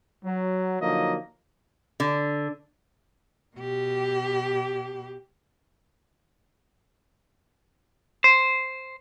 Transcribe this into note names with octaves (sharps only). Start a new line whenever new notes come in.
F#3
D3 F3 F#3 A#3 D#4 D#5
D3
B2 G4
C5